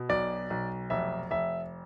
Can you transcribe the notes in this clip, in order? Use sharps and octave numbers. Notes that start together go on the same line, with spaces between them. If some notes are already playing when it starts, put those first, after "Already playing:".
Already playing: B2
B1 D5
B1
F1 E5
F1 E5